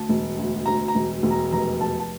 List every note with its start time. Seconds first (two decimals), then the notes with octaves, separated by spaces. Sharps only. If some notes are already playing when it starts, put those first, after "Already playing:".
Already playing: D2 A5
0.09 E1
0.38 D2
0.66 D2 A#5
0.88 A#5
0.95 E1
1.23 E1
1.31 A#5
1.52 F1 A#5
1.81 F1 A5
2.00 A5